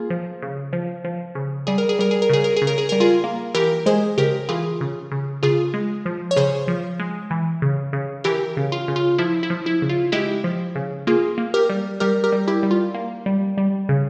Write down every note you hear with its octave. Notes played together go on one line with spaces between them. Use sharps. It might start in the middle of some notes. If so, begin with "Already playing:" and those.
Already playing: A#3 F4 G#4
F3
C#3
F3
F3
C#3
G3 G#4
A#4
G#4
G3 A#4
G#4
A#4
C#3 G#4
A#4
G#4
C#3
A#4
G#4
G3 A#4
F4 G#4
A#3
E3 G4 A#4
G#3 G#4 C5
C#3 G4 A#4
E3 F4 G#4
C#3
C#3
C#3 F4 G#4
G#3
F3
C#5
C#3 G#4 C5
F3
G#3
E3
C#3
C#3
E3 G4 A#4
C#3
F4
C#3
F4
F3 E4
E4
F3
E4
C#3
F4
G#3 E4 G4
F3
C#3
A#3 F4 G#4
A#3
G4 A#4
G3
G3 G4 A#4
G4 A#4
G3
E4 G4
G3
F4
A#3
G3
G3
C#3